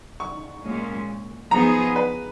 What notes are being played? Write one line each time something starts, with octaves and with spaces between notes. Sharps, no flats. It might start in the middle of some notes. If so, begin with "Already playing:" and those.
C#6
A#2 G#3 C#4
F3 B3 D#4 G#4 A#5
B4